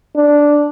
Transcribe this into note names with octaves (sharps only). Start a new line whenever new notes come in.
D4